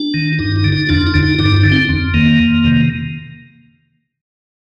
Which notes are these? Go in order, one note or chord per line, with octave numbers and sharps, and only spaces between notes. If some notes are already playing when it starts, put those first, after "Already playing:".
Already playing: D4
D#3
G2 D#4
D#4
D3
D#4
F2 D4
D#4
D3
D#4
G2 D#4
D#4
D3
C4
F2
D#3 A#3
F2
C3 D#3